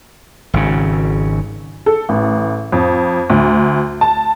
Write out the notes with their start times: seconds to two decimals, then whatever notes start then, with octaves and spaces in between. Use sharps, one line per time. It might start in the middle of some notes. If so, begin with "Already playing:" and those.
0.54 G#1 C#3
1.86 A4
2.09 A1
2.72 F2
3.30 D2
4.01 A5